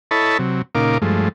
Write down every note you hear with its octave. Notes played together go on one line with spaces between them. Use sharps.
E4 A4 C#5 D#5 A5 B5
C3 F#3
A#2 C#3 D#4 A#4 F5 D6
G2 F3 G#3 A3